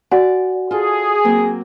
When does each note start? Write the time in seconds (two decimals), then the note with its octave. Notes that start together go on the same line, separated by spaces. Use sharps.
0.11 F#4 D5 F#5 G#5
0.71 F4 G#4 A4
1.24 F#3 A#3 C4